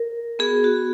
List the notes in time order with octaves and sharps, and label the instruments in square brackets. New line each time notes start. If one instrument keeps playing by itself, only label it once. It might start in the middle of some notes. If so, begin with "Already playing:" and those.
Already playing: [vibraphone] A#4
B3 F#4 G#4
F#4